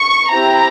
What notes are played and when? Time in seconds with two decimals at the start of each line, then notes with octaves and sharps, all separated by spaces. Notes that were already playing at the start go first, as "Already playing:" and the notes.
Already playing: C#6
0.31 C4 E4 G4 A#5